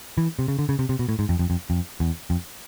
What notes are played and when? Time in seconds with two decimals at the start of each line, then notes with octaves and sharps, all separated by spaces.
0.18 E3
0.39 C3
0.48 C#3
0.59 D3
0.69 C#3
0.79 C3
0.89 C3
0.99 B2
1.09 A2
1.19 G#2
1.29 F2
1.39 F2
1.50 F2
1.70 F2
2.00 E2
2.30 F2